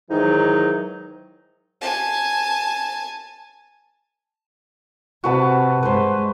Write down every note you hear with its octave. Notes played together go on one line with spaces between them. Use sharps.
G#2 D#3 E3 F#3 D#4
G#5 A5
C3 F#4 B4 A5
G2 G#3 B4 C5